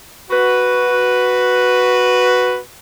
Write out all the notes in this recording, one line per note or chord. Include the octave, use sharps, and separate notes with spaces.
F#4 B4